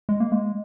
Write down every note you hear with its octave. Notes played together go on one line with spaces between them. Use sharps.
G#3
A#3
G#3